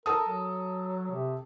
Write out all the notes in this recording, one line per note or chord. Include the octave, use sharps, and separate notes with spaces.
A4 A#4 A5 D#6
F#3
C3